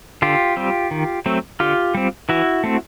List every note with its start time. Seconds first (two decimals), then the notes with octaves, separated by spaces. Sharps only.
0.22 D3 F4 G4
0.57 G3 C4
0.91 D#3
1.26 F#3 A3 C4
1.60 D3 F4 G4
1.95 G3 C4
2.29 E3 E4 F#4
2.64 A3 C4